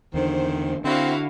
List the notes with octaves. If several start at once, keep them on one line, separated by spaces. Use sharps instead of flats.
E2 D3 D#3 C5
D3 C4 E4 F#4 F5